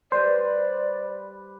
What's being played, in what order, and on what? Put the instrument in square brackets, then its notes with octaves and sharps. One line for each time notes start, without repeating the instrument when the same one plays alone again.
[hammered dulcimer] G3 B4 [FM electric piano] C5 [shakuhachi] D5